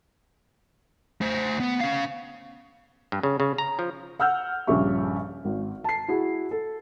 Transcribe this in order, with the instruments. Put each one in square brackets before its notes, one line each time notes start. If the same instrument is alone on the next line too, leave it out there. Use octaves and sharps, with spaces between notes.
[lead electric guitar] A3 C5
B3
C#4 F5
[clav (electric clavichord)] G2
C#3
C#3
A#5
F3
[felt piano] F#5 E6 F6 G6
A#1 G2 C#3 G4 E5 C#6
G#1
A5 C7
E4 F#4 G#4
A4